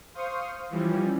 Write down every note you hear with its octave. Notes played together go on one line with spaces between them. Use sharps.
C5 F5 C6 C#6 D#6
E3 F3 G3 C#4